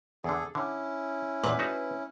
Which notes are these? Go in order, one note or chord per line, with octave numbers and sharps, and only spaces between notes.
E2 D3 G#4 A4
D3 C#4 E4
E2 A#2 B4
A3 D#4 F#4